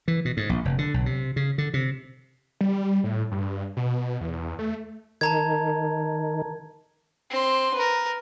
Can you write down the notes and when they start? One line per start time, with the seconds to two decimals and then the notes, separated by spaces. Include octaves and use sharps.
0.08 E3
0.25 B2
0.37 G#2
0.49 A#1
0.65 F1
0.78 D3
0.94 B1
1.06 C3
1.36 C#3
1.58 D3
1.74 C3
2.61 G3
3.04 A2
3.32 G2
3.77 B2
4.21 E2
4.59 A3
5.21 D#3 A5 A#5 G#6
7.30 C4 C6
7.74 A#4 B4